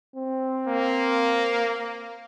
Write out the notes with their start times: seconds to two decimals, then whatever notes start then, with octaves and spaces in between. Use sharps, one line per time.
0.16 C4
0.67 A#3